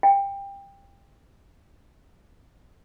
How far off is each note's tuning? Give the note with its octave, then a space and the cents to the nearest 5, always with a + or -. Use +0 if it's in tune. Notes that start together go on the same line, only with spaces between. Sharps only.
G5 +20